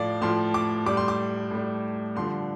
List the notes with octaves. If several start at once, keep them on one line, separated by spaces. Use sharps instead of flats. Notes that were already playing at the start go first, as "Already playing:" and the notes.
Already playing: A2 F3 D5 F5
A2 F3 C6
D6
A2 G3 D6
C6
D6
A2 G3
G2 D3 F3 C6